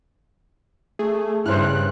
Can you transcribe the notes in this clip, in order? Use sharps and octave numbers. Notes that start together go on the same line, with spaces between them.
A3 G#4
G2 C#3 E4 C5 F6 F#6